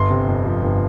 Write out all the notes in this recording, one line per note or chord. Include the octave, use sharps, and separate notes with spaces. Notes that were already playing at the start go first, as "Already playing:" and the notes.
Already playing: G1 C6
C3
F2
F3
G1